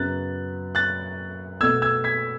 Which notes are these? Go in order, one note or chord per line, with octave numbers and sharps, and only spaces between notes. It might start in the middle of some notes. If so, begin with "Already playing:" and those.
Already playing: F#2 C#3 F#3 B3 F#6 A6
F#6 A6
B2 A3 E6 G#6
E6 G#6
G#6 B6